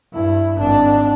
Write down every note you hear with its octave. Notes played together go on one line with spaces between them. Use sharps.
G2 E4
G#1 D4